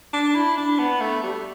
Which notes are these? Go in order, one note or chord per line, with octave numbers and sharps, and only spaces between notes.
D4
E4
D4
B3
A3
G3